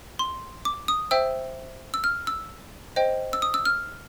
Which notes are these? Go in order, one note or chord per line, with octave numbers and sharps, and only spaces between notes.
C6
D6
D#6
C5 E5 G5 E6
E6
F6
E6
C5 D#5 G5
E6
D#6
E6
F6